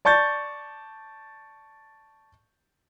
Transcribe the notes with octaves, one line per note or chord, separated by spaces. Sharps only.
D5 A5 C#6 G6 A6